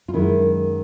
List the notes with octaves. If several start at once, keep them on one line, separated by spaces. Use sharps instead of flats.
F4
F#2 D#3 G#3 E4